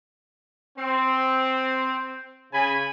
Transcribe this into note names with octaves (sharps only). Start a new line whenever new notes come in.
C4
C#3 G#5 B5